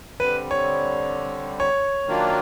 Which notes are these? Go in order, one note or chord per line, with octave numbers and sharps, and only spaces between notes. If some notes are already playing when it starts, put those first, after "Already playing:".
D3 G3 C4 B4
C#5
C#5
D#3 F#3 A#3 D4 F4